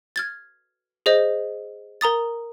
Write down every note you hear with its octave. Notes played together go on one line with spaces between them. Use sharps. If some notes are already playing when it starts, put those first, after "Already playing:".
F6 G#6 A6
G#4 C5 D#5
A#4 A#5 D#6 A6